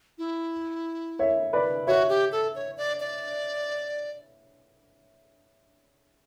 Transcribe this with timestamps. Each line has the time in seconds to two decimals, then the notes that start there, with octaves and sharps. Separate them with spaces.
0.18 E4
1.19 C#5 E5
1.53 B4 D5
1.87 F#4 C#5 E5
2.09 G4
2.32 A4
2.55 C#5
2.77 D5
3.00 D5